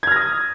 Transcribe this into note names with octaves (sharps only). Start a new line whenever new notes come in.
D#6 F6 G#6 A#6